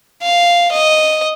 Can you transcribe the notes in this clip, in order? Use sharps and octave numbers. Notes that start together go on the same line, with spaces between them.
F5
D#5